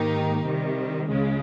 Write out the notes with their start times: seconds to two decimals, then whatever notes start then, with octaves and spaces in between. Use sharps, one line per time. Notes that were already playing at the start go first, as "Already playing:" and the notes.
Already playing: G#2 D#3 A#3 D#4 G4
0.43 C3 D#3 G3
1.08 C#2 C#3 G#3